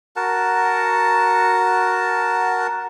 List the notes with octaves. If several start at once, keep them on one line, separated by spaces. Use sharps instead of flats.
F#4 A#4 F#5 A5